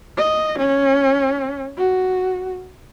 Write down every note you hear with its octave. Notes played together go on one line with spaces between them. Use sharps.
D#5
C#4
F#4